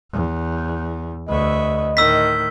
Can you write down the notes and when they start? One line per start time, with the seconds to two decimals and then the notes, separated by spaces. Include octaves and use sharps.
0.12 E2
1.29 D2 B4 D#5 E5 C#6
1.97 A2 D#3 E6 G6 B6